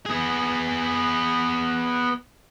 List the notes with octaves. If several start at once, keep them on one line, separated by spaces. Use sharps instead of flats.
B3 G#4